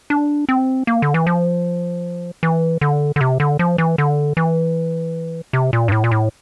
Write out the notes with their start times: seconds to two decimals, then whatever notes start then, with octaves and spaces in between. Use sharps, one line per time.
0.10 D4
0.49 C4
0.87 A#3
1.02 D3
1.14 E3
1.27 F3
2.43 E3
2.81 D3
3.16 D3
3.21 C3
3.40 D3
3.59 F3
3.78 E3
3.98 D3
4.37 E3
5.53 C3
5.73 A#2
5.88 G2
5.92 A2
6.04 A#2
6.11 A2